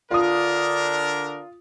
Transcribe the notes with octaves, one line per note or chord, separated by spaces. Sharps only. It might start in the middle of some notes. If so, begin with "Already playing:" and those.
D3 D4 F4 A#4 D#6